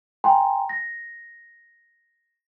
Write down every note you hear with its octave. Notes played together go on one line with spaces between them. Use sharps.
G5 G#5 A#5 C6
A#6